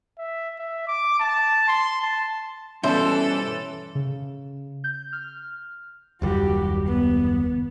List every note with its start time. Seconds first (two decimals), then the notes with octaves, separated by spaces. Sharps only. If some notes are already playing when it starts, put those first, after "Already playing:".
0.18 E5
0.59 E5
0.87 D6
1.20 A5
1.68 C6
2.02 A5
2.83 G2 B2 E3 C#4 A4 C5 E5
3.95 C#3
4.84 G6
5.12 F6
6.22 F#1 D#2 G3 F#4 G4
6.87 B3